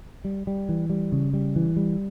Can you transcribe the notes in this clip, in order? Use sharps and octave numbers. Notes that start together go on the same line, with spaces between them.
G3
G3
E3
G3
C#3
G3
E3
G3